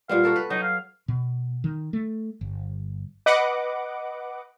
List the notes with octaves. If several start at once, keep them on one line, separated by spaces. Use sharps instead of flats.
A#2 G3 B3 F5
F#4 A4 A#4
B4
F#3 D#4
F5
B2
D#3
A3
G1
B4 D#5 F#5 D6